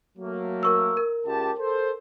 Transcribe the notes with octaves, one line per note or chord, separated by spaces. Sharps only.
F#3 A3 A#3
A#4 C#6 E6
A#4
C#2 G4 A5
A4 C5